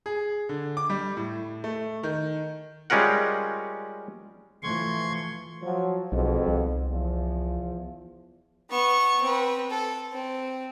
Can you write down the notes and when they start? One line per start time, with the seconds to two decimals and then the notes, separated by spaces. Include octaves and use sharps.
0.06 G#4
0.49 D3
0.77 D6
0.90 G3
1.17 A2
1.64 A3
2.03 D#3
2.90 G3 G#3 C#4 F4 A#4 F#5
4.63 E3 F3 A3 C6 C#6 G#6
5.62 F3 F#3
6.12 B1 F2 G#2 B2
6.48 C2
6.89 E2 F3
8.69 B3 C#6
9.22 C4 B4
9.70 A4
10.12 C4